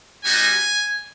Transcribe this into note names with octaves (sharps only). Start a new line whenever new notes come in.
G3 B3 D#4 F#4 G#5